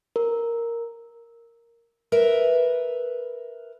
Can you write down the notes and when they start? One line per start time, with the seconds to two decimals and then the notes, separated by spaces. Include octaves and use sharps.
0.16 A#4
2.12 A#4 B4 E5